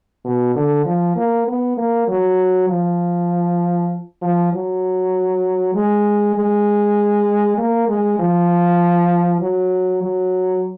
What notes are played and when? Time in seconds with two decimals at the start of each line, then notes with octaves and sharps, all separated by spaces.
0.25 B2
0.55 D3
0.85 F3
1.16 A#3
1.48 B3
1.77 A#3
2.08 F#3
2.69 F3
4.22 F3
4.53 F#3
5.75 G#3
6.36 G#3
7.58 A#3
7.88 G#3
8.19 F3
9.40 F#3
10.02 F#3